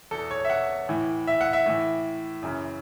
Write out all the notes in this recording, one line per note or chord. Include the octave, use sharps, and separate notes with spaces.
E2 B2 A4
C#5
E5
F#5
A2 E3
E5
F#5
E5
A2 E3
F#2 C#3 E3